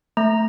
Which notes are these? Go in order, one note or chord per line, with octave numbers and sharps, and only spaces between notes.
A3 A#5